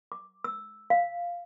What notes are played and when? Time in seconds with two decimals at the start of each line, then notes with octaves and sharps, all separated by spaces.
0.12 D6
0.44 E6
0.90 F5